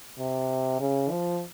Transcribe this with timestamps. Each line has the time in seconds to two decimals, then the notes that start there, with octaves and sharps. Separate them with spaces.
0.19 C3
0.80 C#3
1.11 F3